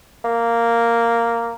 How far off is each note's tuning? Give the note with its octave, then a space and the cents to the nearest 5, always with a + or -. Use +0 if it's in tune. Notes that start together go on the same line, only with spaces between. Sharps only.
A#3 -5